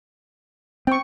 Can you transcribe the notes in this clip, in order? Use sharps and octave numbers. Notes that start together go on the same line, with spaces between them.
C4 G5 C#6